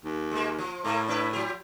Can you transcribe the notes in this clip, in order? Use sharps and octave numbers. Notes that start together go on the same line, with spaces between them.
D#2
G#3 A#3
F3
A2 A3 A#3
D4 E4 B4
F3 G4